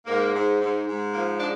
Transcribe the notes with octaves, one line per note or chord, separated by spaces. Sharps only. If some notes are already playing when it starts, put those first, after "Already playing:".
G#2 A#3
G#2
G#2
G#2
F3 A#3
G#3 D4